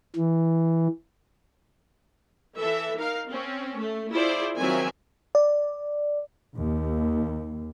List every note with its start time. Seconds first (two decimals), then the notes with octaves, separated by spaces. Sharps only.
0.16 E3
2.58 E3 A4 E5
2.97 D#4 A#4 F5
3.28 C4 C#4
3.77 A3
4.12 E4 F4 G#4 C5 D5
4.58 D#3 F3 F#3 C4 E5 G#5
5.35 D5
6.56 D#2